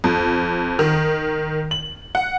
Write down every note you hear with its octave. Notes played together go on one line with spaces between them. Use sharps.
F2
D#3
F#7
F#5